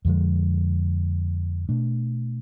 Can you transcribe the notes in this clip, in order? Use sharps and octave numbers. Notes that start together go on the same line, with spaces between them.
F2 D3 F3 G#3
B2 A3 D4